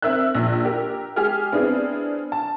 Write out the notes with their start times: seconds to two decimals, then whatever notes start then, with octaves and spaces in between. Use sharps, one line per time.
0.02 C4 A#4 E5 E6 F#6
0.35 A#1
0.65 G4 A#4
1.16 G#3 G4 G#4 G#5 F6
1.52 B3 C4 D4 E4 G#4
2.32 A5